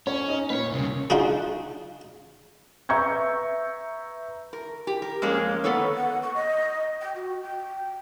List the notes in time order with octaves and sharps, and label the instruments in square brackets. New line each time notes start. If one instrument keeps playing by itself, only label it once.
[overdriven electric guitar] C#4 [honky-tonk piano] C#5
[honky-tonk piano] D#4
[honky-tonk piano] A#2 [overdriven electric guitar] B4 C#5
[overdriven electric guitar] C2 C#3
[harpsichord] D4 D#4 F4 F#4 G#4
[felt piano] B4 E5 A#5 C#6 G6 G#6
[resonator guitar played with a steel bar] A#4
G4
A#4
F2 G#3 A#3 C#4
A#3 B3 A4 B4 C#5
[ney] F#5
C#6
D#5
G5
F#4
G5